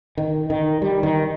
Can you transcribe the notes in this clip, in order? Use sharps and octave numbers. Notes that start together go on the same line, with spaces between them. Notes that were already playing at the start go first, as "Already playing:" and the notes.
D#3
D#3
G3
D#3